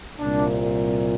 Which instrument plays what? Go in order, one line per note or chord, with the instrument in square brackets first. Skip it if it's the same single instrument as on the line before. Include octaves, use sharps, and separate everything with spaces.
[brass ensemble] C2 A#2 D4